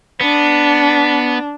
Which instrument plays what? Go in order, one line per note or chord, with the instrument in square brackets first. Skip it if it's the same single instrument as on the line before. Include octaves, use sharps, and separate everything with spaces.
[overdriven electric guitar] B3 [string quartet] D4